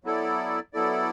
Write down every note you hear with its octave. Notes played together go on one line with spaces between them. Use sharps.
F#3 B3 E4 A4 D5
F#3 B3 E4 A4 D5